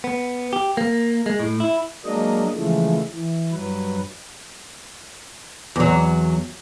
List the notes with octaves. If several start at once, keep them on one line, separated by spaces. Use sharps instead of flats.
B3
G4
A#3
G#3
A2
E4
F#3 G#3 A#3 D4 D#5
C#3 E3 F3 G#3 A3
E3
G2 F#3 B4
E2 F#3